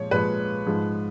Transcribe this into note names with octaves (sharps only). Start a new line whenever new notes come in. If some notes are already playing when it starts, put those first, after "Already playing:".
Already playing: A#2 F3 G#3 C#5
A#2 F3 G#3 B4
G#2 F3 G#3